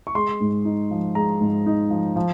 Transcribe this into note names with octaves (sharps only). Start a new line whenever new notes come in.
C#6
G#3 C6
G#2
D#4
F3
G#3 A#5
G#2
D#4
F3
F3